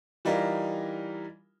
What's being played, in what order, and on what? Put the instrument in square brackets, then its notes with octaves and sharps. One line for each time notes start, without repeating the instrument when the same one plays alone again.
[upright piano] E3 G3 D#4 F4 A#4